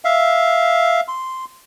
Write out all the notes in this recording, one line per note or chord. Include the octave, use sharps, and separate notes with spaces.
E5 F5
C6